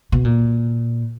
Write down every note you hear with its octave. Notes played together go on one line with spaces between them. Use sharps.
B2
A#2